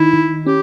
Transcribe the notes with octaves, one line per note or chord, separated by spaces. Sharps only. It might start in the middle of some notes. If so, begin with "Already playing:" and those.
Already playing: D#3 D#4 E4
D#3
C#4 G4